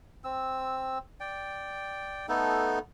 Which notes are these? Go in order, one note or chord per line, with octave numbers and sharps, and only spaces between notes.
C4 E6
D5 G5
A3 B3 D#4 A4